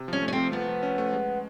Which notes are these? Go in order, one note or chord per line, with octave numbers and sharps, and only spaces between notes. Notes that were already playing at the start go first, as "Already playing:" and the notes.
Already playing: C3
F3 C#4
A3
C#4
C4
F3
F3 B3
F3
C#4
A3
G#3